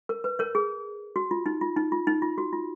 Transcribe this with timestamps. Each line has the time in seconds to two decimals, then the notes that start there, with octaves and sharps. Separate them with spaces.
0.09 A#4
0.24 B4
0.39 A#4 C#5
0.55 G#4
1.16 F#4
1.31 F4
1.46 D#4
1.61 F4
1.76 D#4
1.92 F4
2.07 D#4
2.22 F4
2.38 F#4
2.53 F4